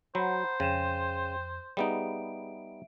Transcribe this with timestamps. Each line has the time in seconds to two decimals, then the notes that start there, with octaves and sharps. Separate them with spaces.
0.15 F#3 C5 F#5 A#5 B5
0.60 F2 C#3 G5 D#7 E7
1.77 G3 B3 D#4 G#4 E5 D7